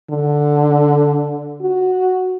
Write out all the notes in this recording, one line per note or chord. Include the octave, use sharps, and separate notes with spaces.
D3
F#4